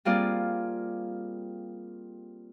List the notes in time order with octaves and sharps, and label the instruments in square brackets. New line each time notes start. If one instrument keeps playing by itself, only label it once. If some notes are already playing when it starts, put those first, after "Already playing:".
[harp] G3 A#3 C4 F4 G#4 D5